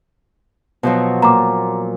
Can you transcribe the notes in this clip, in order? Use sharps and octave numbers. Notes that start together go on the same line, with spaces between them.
B2 F3 F#3
A#2 A#5 D6